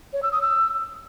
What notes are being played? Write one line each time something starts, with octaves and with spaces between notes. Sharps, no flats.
C#5
E6
D#6
E6